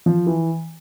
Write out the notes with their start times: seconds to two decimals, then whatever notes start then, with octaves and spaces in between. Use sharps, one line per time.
0.06 F3
0.27 E3